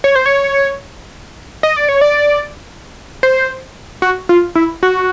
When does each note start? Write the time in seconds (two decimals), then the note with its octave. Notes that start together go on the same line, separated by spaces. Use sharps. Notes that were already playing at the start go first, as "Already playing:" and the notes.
0.04 C#5
0.16 C5
0.26 C#5
1.63 D#5
1.76 D5
1.89 C#5
2.01 D5
3.23 C5
4.02 F#4
4.29 F4
4.55 E4
4.83 F#4